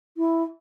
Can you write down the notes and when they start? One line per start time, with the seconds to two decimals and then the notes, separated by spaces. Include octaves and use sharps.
0.17 E4